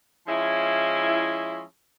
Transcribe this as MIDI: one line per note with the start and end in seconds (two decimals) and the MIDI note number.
0.28 1.62 53
0.28 1.62 56
0.28 1.62 61
0.28 1.62 64